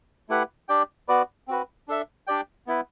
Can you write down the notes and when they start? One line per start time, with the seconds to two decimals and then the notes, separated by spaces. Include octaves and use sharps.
0.29 A3 E4 G4 B4 F#5
0.69 D4 G4 D5 G5
1.08 B3 F#4 B4 D5
1.48 C4 F#4 B4
1.88 D4 A4 E5
2.27 D4 G4 D5 G5
2.67 B3 E4 B4